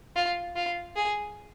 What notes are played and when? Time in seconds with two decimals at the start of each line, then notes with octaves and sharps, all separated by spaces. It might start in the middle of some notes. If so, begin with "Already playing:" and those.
0.16 F4
0.56 F4
0.96 G#4